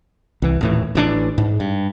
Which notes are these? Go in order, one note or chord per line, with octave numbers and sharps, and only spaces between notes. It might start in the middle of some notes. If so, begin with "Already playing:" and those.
C2 E3
D#1 A2 E3
A1 E3 D4
G#2
G2